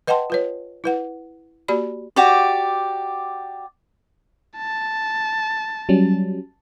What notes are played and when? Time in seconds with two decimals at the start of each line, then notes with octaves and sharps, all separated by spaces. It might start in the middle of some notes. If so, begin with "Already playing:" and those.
0.07 B4 D#5 F#5 G5 A5 C6
0.30 F4 B4 C#5
0.84 E4 B4 F#5
1.68 A#3 F#4 G4 D5 B5
2.16 F#4 G4 D5
4.58 A5
5.89 F#3 G3 C#4